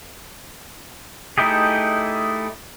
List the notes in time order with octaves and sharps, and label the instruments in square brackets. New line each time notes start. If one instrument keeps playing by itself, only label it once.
[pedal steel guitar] A3 D#4 E4 G4 G#4